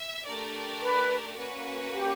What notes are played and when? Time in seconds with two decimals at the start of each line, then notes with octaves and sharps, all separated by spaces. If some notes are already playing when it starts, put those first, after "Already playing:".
Already playing: E5
0.25 A3 D4 G4 A#4 D5
0.81 B4
1.37 A#3 C#4 F#4 B4
1.94 G4